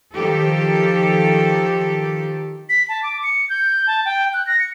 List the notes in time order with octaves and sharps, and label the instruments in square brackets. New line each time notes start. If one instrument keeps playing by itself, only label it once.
[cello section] D#3 F3 G4 A4
[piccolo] B6
A5
D6
C#7
G6
A5
G5
F#6
A#6
C#7